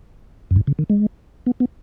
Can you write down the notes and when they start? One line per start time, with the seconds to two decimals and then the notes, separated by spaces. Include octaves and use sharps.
0.51 F#2
0.56 G#2
0.67 C#3
0.79 D#3
0.90 G#3
1.46 B3
1.60 B3